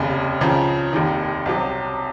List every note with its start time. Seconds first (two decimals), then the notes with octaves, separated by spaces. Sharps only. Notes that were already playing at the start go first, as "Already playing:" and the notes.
Already playing: F1 D#2 C#3
0.41 C#2 C#3 F3
0.93 F1 D#2 D#3
1.46 C2 C3 F#3